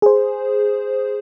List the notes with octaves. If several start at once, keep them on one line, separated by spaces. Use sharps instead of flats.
G#4 C5